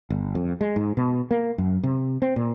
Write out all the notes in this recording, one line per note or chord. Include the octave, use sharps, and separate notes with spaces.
G1
F2
G#3
G#2
B2
A#3
F#2
C3
C4
A#2